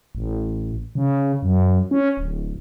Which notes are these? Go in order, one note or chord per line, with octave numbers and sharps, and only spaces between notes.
A1
C#3
F#2
C#4
D1